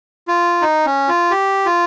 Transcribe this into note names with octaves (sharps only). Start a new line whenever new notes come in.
F4
D#4
C#4
F4
G4
F4